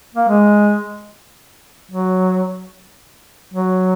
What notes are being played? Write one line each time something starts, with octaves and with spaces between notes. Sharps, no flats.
A#3
G#3
F#3
F#3